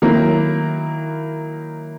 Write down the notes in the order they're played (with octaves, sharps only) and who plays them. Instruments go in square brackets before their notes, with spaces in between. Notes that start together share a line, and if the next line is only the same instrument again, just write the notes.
[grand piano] D#3 F#3 A#3 E4